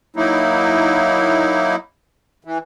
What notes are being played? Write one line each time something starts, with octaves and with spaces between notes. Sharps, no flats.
F#3 A#3 D#4 E4
E3